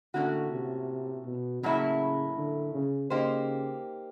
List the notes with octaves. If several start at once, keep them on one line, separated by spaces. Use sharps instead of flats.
A2 D3 F3 A#3 C#4 F#4
C3
B2
A2 C#3 F#3 A#3 C#4 E4
D3
C#3
C#3 A#3 D#4 G4 C5